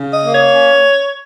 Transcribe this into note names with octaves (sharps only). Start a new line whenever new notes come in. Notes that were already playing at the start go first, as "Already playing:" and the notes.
Already playing: C#3
D#5
A#3
C#5
C#4